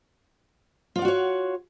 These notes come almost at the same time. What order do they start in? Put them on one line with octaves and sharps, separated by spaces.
F4 D5 F#5 F#4 C#5